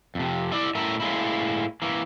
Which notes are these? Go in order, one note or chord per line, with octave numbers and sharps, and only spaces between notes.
F2 C3
E4 D5 E5
A2 A#4 E5
A2 G#3 A#3 E4
E3 A#3